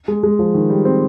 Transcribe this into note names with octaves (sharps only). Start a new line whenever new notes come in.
G#3
G#3
F3
D#3
G3
C4